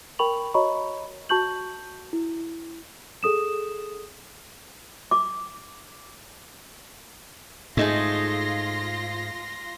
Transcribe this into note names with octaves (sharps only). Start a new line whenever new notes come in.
A#4 G5 B5 C#6 F7 F#7
F#4 C#5 D#5 A#5 B5 C#6
F#4 A5 C#6 G6 F#7
E4
G#4 A4 D#6 E7
D6
G#2 A3 D#4 F4 G#4 C6 A#6